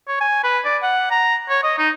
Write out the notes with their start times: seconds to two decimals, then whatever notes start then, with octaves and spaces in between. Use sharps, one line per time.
0.08 C#5
0.21 G#5
0.44 B4
0.65 D5
0.83 F#5
1.11 A#5
1.49 C#5
1.64 D#5
1.79 D#4